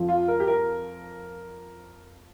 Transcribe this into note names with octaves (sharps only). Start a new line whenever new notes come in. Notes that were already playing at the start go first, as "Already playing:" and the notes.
Already playing: F2 F3
F4
A#4
G4
A#4